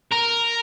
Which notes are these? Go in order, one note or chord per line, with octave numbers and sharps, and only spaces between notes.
A#4